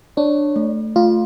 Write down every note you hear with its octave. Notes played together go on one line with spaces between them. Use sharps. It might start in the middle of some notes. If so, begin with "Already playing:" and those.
D4 C#5
A3
A3 F4